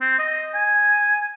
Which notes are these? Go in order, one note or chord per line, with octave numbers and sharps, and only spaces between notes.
C4
D#5
G#5